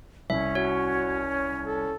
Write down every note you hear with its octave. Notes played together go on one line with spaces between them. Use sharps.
C2 C#4 E5
F#4 C#5
A4